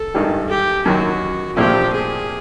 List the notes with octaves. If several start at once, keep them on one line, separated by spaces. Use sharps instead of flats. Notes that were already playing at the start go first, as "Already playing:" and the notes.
Already playing: A4
G#1 G2 D#3 G3
G4
F#2 D#3 F#3 F#4
A#1 A#2 F3 A3 C4 G4
G#4